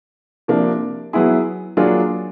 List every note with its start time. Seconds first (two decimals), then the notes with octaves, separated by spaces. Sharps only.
0.48 C3 F3 A#3 D4
1.13 F#3 B3 E4 G#4
1.77 F#3 A#3 D4 F4 G#4